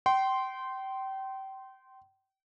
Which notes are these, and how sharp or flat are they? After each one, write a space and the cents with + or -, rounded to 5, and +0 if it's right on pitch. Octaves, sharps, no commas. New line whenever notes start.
G5 -30 C6 +0